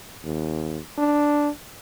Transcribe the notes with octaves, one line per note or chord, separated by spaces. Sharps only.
D#2
D4